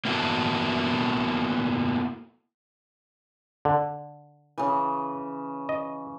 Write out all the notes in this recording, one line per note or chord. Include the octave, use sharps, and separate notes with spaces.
A#3 B3 E4 F#4 A4
D3
C#3 E3
D#5